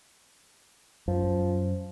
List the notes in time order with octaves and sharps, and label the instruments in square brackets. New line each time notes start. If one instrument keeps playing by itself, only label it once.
[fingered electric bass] F#2 [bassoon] F3